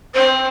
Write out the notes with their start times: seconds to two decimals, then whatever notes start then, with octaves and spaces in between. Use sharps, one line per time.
0.14 C4 C5